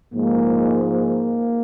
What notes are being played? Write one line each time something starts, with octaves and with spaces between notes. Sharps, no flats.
G#2 F3 G#3 A#3
A#3